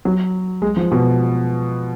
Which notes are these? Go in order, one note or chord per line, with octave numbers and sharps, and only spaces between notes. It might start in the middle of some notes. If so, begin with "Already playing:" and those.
F#3
G#3
F3
B2